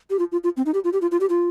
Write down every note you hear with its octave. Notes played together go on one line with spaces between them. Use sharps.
G4
F4
F4
F4
C4
D#4
G4
F4
G4
F4
F4
G4
F4